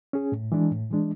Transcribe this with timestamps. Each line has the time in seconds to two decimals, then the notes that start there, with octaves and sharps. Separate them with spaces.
0.13 C#4 G#4
0.32 A2
0.52 E3 G#3 D4
0.71 A2
0.91 E3 G#3 D4